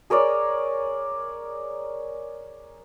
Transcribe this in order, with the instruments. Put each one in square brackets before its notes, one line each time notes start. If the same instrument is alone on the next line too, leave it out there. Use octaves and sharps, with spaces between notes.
[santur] G#4 A#4 C#5 D5